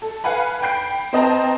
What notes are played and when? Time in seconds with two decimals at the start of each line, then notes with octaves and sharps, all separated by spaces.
0.02 A4
0.24 B4 F5 F#5 G#5 B5
0.62 G5 B5 G6 C7 D7
1.13 C4 B4 D#5 G5 A5 A#5